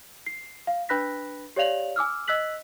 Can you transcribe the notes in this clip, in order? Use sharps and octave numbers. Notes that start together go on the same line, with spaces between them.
C7
F5
D4 B4 B5 F#6 A#6 B6
G4 C#5 D5 F5 F7 F#7
G#5 D6 E6 F6
D#5 E6 F#6 B6 F#7